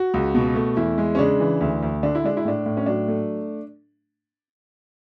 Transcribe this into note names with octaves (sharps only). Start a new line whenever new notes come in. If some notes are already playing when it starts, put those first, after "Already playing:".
Already playing: F#4
C#2
B2
A3
E2 E4
G#3
C#4
C#3 D4
E3
D2
D2
D3 D4
E4
G#3 D4
E4
A2 D4
A2
C#4
F#3 D4
A3